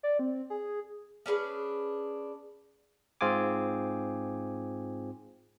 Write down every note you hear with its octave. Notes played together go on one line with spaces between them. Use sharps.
D5
C4
G#4
C#4 D4 G#4 B4
G#2 C4 F4 G#4 G#5 D6